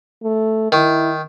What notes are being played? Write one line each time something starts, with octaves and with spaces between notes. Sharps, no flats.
A3
D#3 E4